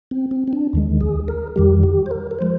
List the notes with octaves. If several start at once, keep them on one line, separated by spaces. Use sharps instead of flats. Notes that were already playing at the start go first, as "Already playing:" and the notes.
C4
C4
C4
D4
D#2 D#3 G#3
G#4
A#4
F2 D#3 G3 G4
G4
C5
A#4
A#4
F3 G#3 C5